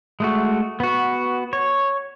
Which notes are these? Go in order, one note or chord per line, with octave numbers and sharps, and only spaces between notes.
G#3 A3 F#4
B3 F#4
C#5